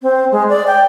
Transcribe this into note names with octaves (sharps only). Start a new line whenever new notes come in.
C4
G#3
D5
G5